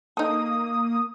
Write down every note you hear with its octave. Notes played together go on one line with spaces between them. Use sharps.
A#3 D#4 A4 D#6